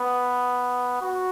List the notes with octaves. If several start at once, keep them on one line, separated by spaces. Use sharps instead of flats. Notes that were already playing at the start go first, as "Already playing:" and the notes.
Already playing: B3
F#4